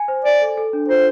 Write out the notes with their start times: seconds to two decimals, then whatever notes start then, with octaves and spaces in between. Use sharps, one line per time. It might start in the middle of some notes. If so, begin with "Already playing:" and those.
Already playing: G#5
0.08 C5
0.25 D5 G#5
0.41 A4
0.57 A4
0.73 D4
0.88 F4 C5